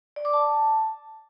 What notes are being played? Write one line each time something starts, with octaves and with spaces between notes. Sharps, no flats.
D5
D6
A5